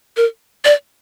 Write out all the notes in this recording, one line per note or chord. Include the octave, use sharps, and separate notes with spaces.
A#4
D5